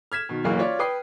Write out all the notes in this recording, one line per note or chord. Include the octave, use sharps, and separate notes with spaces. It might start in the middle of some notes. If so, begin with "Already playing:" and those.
F6 G#6 B6 E7
B2 D#3
F#1 B1 E3 A#3 C#6 F6
F4 C#5 D5
B4 G5 D#6 C7